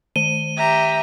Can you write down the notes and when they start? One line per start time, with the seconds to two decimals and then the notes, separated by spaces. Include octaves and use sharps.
0.16 D#3 D#7 G7
0.58 G4 E5 A#5